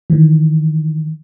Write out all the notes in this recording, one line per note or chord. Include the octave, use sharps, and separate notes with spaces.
D#3 E3